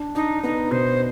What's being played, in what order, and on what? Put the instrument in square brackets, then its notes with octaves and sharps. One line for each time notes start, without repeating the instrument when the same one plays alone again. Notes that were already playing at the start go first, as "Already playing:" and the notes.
Already playing: [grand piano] D4
[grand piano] D4 [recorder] D#4
[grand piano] B3 [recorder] D#4
[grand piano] B2 [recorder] C5